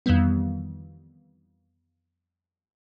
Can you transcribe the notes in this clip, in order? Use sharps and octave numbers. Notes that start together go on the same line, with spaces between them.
F2 D#3 E3 G3 B3